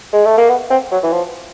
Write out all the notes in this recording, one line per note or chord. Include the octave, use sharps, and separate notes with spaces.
G#3
A3
A#3
B3
C4
F#3
E3
F3